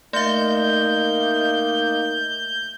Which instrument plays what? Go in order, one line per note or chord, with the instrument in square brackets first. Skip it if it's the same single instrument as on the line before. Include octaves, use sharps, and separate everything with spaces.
[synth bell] A3 E5 [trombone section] A#3 D#4 [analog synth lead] G6